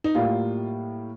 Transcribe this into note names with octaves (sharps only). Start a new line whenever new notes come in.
D#4
A2 G3 A#3 F4